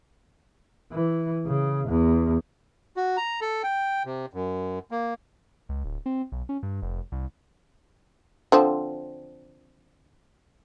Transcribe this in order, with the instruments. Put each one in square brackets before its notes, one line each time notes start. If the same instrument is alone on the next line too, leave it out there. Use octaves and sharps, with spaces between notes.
[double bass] E3
C#3
E2
[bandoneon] F#4
A#5
A4
G5
C3
F#2
A#3
[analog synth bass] C#2
D1
C4
B1
C#4
G2
F1
C2
[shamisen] D3 F3 C4